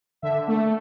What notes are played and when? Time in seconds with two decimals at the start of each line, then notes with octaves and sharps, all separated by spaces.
0.22 D3 E5
0.48 A3